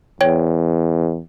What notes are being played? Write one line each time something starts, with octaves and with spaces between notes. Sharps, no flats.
E2 C#5 G5